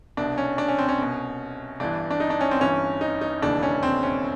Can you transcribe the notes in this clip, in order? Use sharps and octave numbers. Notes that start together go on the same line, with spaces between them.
C2 B2 D4
C#4
D4
C#4
C4
C#4
C2 B2
G1 G2 E3 D4
D4
D#4
D4
C#4
C4
G1 G2 E3 C#4
D#4
D#4
E1 D#2 C#3 E3 D4
C#4
C4
C#4